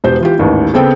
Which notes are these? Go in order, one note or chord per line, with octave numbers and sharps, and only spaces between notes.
E1 G4 C5 G6
E3 F4 G4
A1 D#2 G#2
C#3 B3 C4 A4 G5